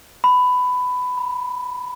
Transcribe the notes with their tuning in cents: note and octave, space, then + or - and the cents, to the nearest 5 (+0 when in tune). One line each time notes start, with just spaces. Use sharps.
B5 +15
B5 -45